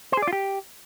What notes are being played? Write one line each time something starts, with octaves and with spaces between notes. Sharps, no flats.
C5
G#4
D5
F4
G4